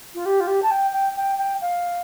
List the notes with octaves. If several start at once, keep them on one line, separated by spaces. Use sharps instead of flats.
F4
G4
F4
G4
A5
G5
G5
G5
G5
F5